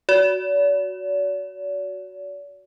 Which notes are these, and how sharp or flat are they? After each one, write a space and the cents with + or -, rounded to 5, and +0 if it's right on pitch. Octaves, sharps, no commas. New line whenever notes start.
F#4 +0 D5 -45